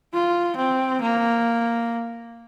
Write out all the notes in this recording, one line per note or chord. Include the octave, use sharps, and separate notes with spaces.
F4
C4
A#3